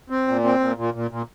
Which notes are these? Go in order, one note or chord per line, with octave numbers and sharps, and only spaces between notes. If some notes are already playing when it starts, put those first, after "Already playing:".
C4
A#2
C4
A#2
A#2
A#2
A#2